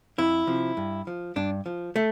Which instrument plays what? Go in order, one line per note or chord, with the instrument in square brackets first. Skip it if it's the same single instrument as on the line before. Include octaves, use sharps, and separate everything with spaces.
[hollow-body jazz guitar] F2 E4
C3 F3
G2
F3
G2 D4
F3
A3